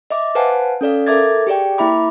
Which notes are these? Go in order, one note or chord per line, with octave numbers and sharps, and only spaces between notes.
D#5 E5 D6
B4 C5 F5 F#5 G#5 A5
C#4 A4 D5 F5
A4 A#4 E5 D6 G#6 A6
G4 G#4 D5 G5
A#3 E4 E5 B5 D6